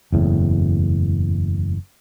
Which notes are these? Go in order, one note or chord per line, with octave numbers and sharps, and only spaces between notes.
F#1 E2 A2